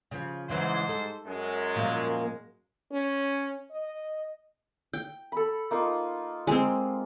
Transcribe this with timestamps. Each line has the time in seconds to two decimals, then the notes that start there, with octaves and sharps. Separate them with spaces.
0.11 C#3 F3
0.49 G#2 C#3 E3 F#3 C5
0.89 A4
1.26 F#2 G#3
1.76 A#2 F3 A#3
2.91 C#4
3.71 D#5
4.93 G5
5.32 A4 B5
5.71 A#3 D#4 F4
6.47 G#3 C4